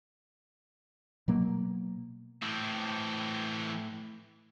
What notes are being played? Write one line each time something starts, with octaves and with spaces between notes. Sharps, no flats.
B2 F#3 A#3
A2 E3 C4